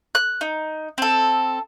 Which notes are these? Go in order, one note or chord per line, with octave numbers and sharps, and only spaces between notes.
F#6
D#4
C4 A4